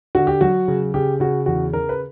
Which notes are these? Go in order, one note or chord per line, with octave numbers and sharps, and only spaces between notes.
D3 F#4
G4
F#3 F#4
C#3
C#3 G4
C#3 F#4
E2 F#4
C#3 A#4
B4